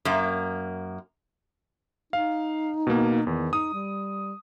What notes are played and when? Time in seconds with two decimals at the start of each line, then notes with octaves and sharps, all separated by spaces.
0.05 F#2 A#3
2.13 D#4 F5
2.87 B2 A#3
3.27 E2 D#3
3.53 D#4 D#6
3.74 G3